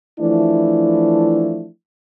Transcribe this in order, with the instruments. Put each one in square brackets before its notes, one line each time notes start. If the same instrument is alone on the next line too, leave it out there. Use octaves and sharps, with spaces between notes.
[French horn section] E3 F3 A3 D4 E4